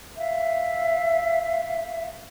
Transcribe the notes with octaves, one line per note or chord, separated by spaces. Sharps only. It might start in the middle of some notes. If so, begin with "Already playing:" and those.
E5 F5